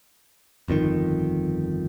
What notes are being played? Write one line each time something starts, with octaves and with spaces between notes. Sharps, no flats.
G1 F2 A2 D#3